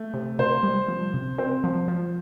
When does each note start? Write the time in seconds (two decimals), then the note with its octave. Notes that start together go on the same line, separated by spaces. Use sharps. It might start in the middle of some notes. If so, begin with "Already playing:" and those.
Already playing: A3
0.14 C3
0.39 C3 C5
0.63 G3
0.88 F3
1.14 C3
1.38 C4 C5
1.64 F3
1.88 F3